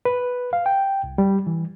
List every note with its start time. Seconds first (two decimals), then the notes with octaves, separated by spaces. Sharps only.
0.05 B4
0.53 F5
0.66 G5
1.04 C2
1.18 G3
1.47 E3